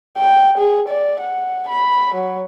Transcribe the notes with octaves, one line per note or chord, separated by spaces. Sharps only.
G5
G#4
D5
F#5
B5
F#3